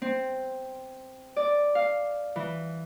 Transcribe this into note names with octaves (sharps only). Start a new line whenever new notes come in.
C4
D5
F5
E3